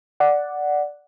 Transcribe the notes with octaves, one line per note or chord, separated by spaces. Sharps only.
D5 F#5